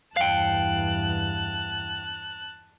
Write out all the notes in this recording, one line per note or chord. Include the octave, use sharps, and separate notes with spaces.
E2 G2 F5 G5 A5 F#6